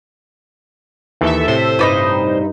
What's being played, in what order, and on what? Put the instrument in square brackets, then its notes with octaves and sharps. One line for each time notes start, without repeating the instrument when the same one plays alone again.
[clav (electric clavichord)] D#2 D#3 E3 [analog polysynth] A4 E5
[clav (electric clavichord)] A2 C3 [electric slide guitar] C5
[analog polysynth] G2 D#4 [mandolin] B4 D5 D#5